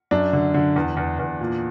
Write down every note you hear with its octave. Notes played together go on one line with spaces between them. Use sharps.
F#2 D4
D3
D3
E2
E2
E2
A#2